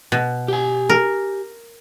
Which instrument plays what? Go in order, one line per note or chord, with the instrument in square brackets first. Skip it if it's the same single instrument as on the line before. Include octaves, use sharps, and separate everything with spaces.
[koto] B2
[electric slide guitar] G4 G#5
[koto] A#4